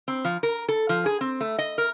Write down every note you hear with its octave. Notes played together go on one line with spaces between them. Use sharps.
C4
F3
A#4
A4
F3
G#4
C4
A3
D#5
A#4